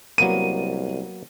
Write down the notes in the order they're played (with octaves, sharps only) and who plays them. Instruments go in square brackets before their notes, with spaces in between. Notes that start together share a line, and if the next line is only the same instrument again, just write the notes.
[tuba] C2 [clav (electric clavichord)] F#3 A#3 B3 [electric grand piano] D#7